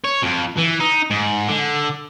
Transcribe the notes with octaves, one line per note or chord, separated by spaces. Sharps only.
C#5
F2
E3
D#4
G#2
D3